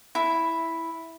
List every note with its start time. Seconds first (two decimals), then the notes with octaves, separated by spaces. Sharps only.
0.15 E4